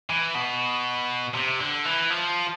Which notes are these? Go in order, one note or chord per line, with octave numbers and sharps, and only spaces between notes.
E3
B2
C3
D3
E3
F3